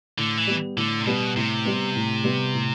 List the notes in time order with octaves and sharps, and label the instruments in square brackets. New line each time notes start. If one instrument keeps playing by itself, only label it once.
[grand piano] A2 [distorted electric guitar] D3
[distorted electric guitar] E3
[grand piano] G3 B3
[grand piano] A2 [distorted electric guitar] D3
[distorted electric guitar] C3
[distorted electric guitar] B2 [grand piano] G3 B3
[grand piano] A2 [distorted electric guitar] C3
[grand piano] G3 B3
A2
G3 B3
A2